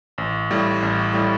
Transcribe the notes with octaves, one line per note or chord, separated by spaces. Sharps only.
A1
A2 G3
A1
A2 G3